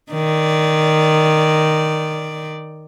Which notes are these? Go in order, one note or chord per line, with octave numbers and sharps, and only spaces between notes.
D#3 D5